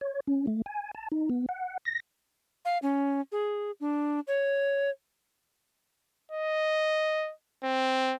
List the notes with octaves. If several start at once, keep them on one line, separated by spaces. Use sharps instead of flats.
C#5
C#4
A3
G#5
A5
D#4
B3
F#5
A#6
F5
C#4
G#4
D4
C#5
D#5
C4